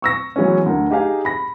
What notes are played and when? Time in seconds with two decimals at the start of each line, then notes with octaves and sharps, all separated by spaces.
0.02 C#6 E6 A#6
0.36 E3 F#3 G#3 B3 C#4
0.66 D2 A#4
0.91 D#4 G4 G#4 F5 G#5
1.25 B5 A#6